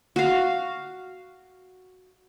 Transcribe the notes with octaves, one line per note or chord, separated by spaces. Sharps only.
F#4 F5